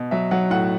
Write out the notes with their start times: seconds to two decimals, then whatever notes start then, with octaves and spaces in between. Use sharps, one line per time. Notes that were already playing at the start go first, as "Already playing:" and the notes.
Already playing: B2
0.11 F#3 E5
0.31 F#3 F#5
0.50 A2 F#5